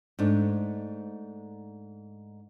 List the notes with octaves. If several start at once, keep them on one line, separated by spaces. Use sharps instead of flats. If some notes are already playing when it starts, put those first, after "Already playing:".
G#2 A3 D4